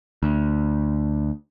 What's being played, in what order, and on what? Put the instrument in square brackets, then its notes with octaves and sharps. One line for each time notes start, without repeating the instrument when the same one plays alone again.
[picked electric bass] D2